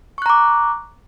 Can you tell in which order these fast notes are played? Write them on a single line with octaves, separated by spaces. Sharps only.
C#6 F#6 A#5 D6